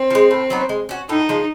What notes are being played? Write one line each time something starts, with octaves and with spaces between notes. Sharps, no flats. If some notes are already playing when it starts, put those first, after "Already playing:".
Already playing: C4
F3
G#3
A2
F#3 B3 D#4
G#3
C#4 F#4
A2 D#4
F3 G#3